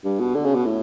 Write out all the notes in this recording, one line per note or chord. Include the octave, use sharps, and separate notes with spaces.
G2
B2
D3
C#3
B2
A2